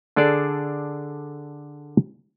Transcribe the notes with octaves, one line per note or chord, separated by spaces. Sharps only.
D3 D4 G#4 A4 D5